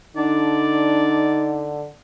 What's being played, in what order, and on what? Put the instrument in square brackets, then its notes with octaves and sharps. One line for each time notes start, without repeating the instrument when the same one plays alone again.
[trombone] D3 [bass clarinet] D4 [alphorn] D#4 [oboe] D5